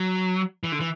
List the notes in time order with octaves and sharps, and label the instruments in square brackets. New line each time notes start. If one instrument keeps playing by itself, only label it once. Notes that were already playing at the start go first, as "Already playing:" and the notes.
Already playing: [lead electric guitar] F#3
E3
D3
E3